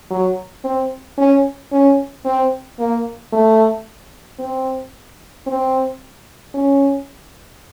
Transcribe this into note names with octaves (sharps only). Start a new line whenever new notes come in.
F#3
C4
C#4
C#4
C4
A#3
A3
C4
C4
C#4